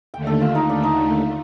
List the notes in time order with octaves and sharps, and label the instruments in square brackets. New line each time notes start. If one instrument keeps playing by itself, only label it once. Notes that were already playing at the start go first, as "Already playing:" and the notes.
[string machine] D#2 D3 A3 [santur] G5
[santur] A4
F4
D#4
[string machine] D#2 D3 A3 [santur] D4
[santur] D#4